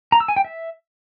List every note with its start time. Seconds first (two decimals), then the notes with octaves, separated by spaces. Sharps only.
0.12 A#5
0.20 E6
0.28 G#5
0.36 G5
0.45 E5